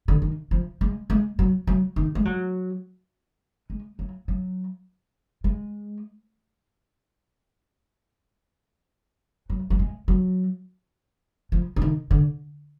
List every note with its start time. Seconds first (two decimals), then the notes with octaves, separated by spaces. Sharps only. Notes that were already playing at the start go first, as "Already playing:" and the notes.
0.08 D3
0.22 D#3
0.51 F3
0.81 G#3
1.10 G#3
1.39 F#3
1.67 F#3
1.96 D#3
2.15 G#3
2.25 F#3
3.70 G#3
3.99 F#3
4.28 F#3
5.44 G#3
9.50 F#3
9.70 F#3
9.79 G#3
10.08 F#3
11.52 F3
11.76 D3
11.82 D#3
12.11 D3